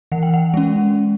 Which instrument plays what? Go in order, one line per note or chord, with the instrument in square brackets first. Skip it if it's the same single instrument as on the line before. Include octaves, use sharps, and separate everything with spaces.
[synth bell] E3 F#5
G5
F#5
G#3 C#4